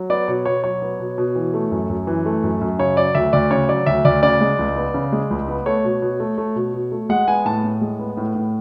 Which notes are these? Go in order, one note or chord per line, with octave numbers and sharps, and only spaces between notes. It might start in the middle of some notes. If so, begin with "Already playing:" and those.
Already playing: F#3
B3 D5
B2 C#5
B2 C#5
F#3 C#5
B3
B2
B2
E3
A3
F#2
F#2
E3
A3
F#2
F#2
C#3 C#5
F#3 D5
D2 E5
D2 D5
C#3 C#5
F#3 D5
D2 E5
D2 D5
C#3 D5
G#3
C#2
B3
C#3
G#3
C#2
B3
A3 C#5
B2
B2
A3
A3
B2
B2
A3
G#3 F#5
B3 G#5
A2 A5
A2
G#3
B3
A2
A2